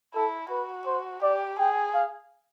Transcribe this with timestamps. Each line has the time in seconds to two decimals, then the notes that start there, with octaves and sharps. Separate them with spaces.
0.14 E4 A4
0.50 F#4 B4
0.86 C5
1.22 G4 D5
1.59 G#4 G5
1.94 F5